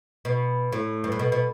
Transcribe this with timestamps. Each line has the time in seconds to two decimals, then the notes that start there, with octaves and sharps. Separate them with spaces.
0.25 B2
0.72 A2
1.04 G2
1.12 A2
1.19 B2
1.32 B2